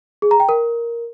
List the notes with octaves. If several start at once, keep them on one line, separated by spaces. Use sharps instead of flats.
G#4
A#5
G5
A#4